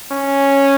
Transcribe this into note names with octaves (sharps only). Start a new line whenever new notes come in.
C#4